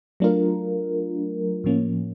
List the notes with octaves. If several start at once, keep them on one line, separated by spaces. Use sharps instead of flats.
F#3 A3 D4 F4 A#4
A2 F3 A#3 C#4